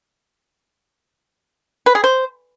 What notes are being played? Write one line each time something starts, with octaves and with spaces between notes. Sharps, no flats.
B4
G#4
C5